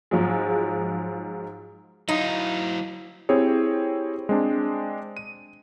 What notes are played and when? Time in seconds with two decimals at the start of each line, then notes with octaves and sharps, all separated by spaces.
0.11 G#2 F3 F#3 G#3
2.09 F#3 D#4 E4 F5
3.29 C4 E4 G4 G#4 C#5
4.29 G#3 C4 D4
5.17 D#7